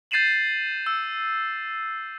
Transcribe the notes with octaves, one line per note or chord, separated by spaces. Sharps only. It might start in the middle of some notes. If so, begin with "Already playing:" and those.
G6 A6 C7 D#7 E7 F#7
E6